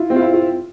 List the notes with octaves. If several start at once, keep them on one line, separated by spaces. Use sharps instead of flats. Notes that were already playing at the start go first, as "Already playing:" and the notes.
Already playing: E4 F4
C4
F4
E4
F4